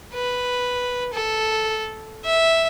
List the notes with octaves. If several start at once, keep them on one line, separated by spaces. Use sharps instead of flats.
B4
A4
E5